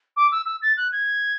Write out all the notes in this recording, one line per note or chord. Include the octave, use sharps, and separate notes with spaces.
D6
E6
E6
A6
F#6
G#6